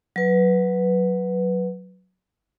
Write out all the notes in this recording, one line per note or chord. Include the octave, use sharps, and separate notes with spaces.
F#3 B4